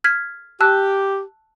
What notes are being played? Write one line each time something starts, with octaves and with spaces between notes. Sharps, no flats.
F6 G#6 B6
G4 A5 E6 F#6